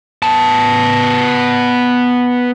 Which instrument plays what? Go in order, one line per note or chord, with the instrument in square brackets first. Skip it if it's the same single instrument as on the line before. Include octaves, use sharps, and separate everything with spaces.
[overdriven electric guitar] B3 A5